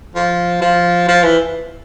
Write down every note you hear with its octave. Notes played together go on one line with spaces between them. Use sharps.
F3
F3
F3
E3